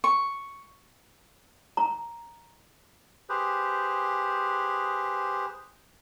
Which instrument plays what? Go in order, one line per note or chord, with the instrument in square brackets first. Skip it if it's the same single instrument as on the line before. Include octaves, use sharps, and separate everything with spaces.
[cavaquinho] C#6
[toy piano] A#5
[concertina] G4 G#4 B4 C5